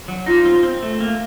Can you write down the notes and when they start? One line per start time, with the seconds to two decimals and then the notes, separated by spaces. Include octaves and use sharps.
0.08 F#3
0.26 D#4 F4
0.45 C4
0.63 C4
0.83 A3
1.00 A#3